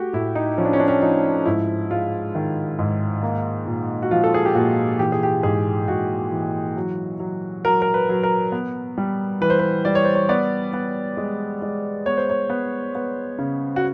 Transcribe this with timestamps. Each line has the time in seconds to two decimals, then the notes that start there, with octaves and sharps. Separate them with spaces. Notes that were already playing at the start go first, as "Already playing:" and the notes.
Already playing: A3 F#4 G4
0.13 A2 E4
0.35 D#4
0.58 F3 C#4
0.65 D4
0.73 C#4
0.80 D4
0.88 C#4
1.02 F3 D#4
1.46 G#2 E4
1.91 G#3 F4
2.35 D#3
2.79 G#2
3.23 A#3
3.66 A#2
4.02 F#4
4.11 F3 F4
4.24 A4
4.34 G#4
4.45 G4
4.55 A#2 F#4
4.99 E3 G4
5.12 G#4
5.23 G4
5.43 G#2 G#4
5.88 G#2 F#4
6.32 E3
6.77 F#3
7.20 F#3
7.65 F#3 A#4
7.82 A#4
7.94 B4
8.09 F#3
8.23 A#4
8.52 B3
8.98 G3
9.41 E3 B4
9.50 C5
9.59 B4
9.85 G3 D5
9.95 C#5
10.04 C5
10.15 C#5
10.29 B3 D5
10.73 B3
11.17 G#3
11.62 G#3
12.06 B3 C#5
12.17 C5
12.30 C#5
12.50 B3
12.95 B3
13.39 C#3
13.76 F#4